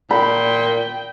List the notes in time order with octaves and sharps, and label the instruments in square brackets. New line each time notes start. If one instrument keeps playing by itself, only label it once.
[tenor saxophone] A#2 [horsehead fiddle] G5 [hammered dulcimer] B5